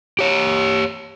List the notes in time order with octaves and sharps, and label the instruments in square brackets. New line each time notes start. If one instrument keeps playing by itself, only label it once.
[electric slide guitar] G4 C#5